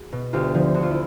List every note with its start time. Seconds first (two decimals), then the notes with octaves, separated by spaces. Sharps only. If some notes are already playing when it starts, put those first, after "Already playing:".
Already playing: F#4 G#4
0.13 B2
0.33 D2 F4 G4
0.54 D3 F3
0.74 D2 F#4
0.83 F4
0.91 E4